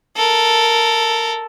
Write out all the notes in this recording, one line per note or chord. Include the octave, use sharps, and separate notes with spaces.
A4 A#4